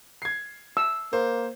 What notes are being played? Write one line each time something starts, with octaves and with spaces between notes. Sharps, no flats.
G#6 C7
E6
A#3 C5